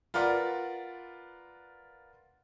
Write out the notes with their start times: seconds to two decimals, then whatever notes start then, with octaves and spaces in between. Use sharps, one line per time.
0.14 F4 A#4 B4 D5 F#5